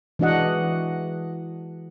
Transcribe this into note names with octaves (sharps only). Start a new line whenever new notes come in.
E3 G#3 D4 F#4 D#5 F#5